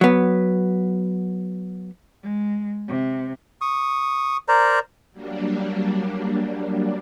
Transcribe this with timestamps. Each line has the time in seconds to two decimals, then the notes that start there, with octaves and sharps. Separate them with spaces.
0.01 F#3 B3
2.23 G#3
2.88 C3
3.61 C#6 D#6
4.48 A#4 C5 D5 A#5
5.12 F#3 G3 A#3 D4